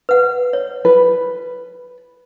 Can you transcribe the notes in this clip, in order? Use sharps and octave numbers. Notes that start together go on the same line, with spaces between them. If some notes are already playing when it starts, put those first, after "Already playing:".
B4 F#5
C#5
B4